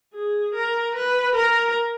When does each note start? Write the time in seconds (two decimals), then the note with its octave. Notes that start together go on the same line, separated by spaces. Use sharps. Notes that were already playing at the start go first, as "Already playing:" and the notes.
0.14 G#4
0.55 A#4
0.95 B4
1.35 A#4